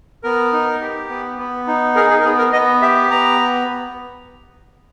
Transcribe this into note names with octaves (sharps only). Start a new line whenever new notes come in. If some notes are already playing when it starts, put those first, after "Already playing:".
B3 A#4
D#4
G4
B3
B3
D#4
G#4 A#4
G#4
A#4
B3 G#4
A#4
B3 D#5
G4 E5
B3 A#5